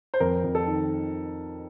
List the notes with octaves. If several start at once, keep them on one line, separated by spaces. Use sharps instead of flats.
C5
F2 A#4
F2
A4
D#3